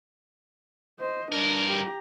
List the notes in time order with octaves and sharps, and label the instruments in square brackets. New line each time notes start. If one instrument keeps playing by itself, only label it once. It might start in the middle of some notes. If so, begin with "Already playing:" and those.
[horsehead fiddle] C5 D#5
[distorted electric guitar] G2 A#4 [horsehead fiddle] D4
[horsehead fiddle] G4 A#5